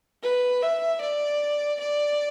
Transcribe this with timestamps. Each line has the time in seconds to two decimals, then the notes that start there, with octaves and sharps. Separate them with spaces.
0.23 B4
0.62 E5
1.01 D5
1.80 D5